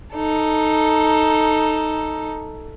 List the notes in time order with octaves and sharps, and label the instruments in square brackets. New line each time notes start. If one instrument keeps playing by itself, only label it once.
[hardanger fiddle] D#4 A4